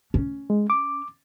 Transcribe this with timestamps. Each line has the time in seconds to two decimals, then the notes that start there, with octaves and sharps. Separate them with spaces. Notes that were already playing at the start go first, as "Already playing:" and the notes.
0.14 C#4
0.50 G#3
0.70 D6